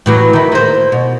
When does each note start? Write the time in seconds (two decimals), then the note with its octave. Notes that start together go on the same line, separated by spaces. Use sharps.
0.06 A2 E3 F#3
0.33 D#3 E4
0.52 A#3 C5
0.92 B2